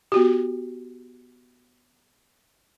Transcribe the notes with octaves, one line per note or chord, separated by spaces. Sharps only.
B3 F#4 G4